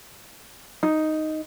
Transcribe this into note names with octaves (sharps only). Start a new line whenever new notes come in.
D#4